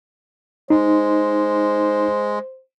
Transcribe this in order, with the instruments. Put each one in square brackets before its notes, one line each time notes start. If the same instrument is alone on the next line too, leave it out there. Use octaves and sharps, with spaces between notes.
[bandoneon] G#3 [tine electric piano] D#4 [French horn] C5